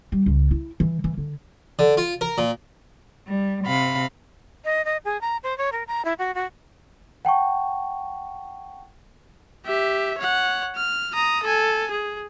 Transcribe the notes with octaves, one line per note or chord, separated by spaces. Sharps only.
G3
C#2
E4
E3
E3
D3
D3
F4
A#4
A#2
G3
C3 F5 B5
D#5
D#5
G#4
A#5
C5
C#5
A#4
A#5
E4
F#4
F#4
F#5 G5 A5 C#6
G4 E5
C#5 F#5
F6
A#5 D#6
A4 G#5
G#4